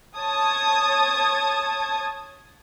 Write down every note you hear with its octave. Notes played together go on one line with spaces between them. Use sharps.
C#5 A5 D#6 G#6